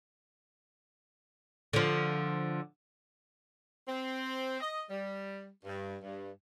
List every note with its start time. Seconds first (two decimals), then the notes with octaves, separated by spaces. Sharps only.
1.73 D3 F3
3.88 C4
4.61 D#5
4.89 G3
5.65 G2
6.02 G2